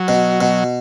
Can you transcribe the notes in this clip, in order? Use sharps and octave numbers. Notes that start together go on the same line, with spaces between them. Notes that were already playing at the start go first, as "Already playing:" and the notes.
Already playing: F#3
B2
B2